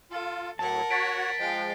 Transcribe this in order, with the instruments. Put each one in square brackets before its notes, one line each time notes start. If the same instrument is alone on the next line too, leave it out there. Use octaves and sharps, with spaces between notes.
[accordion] F4 [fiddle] A4
[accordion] A2 F#3 [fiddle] A#4 F#5 [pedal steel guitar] A5
[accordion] F#4 C#5 [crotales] A6 B6 D7
[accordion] F3 G#3 [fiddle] F5 G5